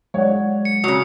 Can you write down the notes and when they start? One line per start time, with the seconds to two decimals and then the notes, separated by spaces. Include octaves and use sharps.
0.14 F#3 G#3 C#5 D5 F#5
0.65 C#7
0.84 C#3 F#3 D#6